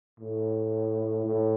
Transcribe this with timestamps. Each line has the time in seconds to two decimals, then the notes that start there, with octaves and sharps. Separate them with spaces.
0.20 A2
1.26 A2